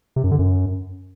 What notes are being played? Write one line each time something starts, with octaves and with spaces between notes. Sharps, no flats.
C3
F#2
D3
F#2